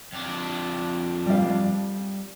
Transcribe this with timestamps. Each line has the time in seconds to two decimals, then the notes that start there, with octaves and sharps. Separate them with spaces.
0.13 F2 D4
1.26 G3 F5